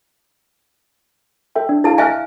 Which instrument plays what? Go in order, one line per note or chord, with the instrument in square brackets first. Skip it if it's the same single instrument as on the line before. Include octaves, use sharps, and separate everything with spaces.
[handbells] A4 E5 G5
D4
[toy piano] E4 A5 [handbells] G#4 F5
[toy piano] E5 F5 G#5 [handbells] F6 F#6 A#6